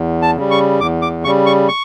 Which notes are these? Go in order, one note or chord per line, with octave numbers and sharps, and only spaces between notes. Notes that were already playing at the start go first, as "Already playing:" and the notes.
Already playing: E2
A5
C#3 G3
C#6
E2 D6
D6
C#3 G3 C#6
C#6
C#6